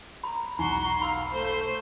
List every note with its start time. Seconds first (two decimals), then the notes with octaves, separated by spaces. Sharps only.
0.24 A#5 B5
0.59 B1 E2 D#4 F#4 C6
1.01 F5 B5 E6
1.32 A3 C5